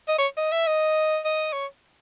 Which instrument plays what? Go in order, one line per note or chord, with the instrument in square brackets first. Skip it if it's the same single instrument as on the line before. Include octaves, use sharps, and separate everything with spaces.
[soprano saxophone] D#5
C#5
D#5
E5
D#5
D#5
C#5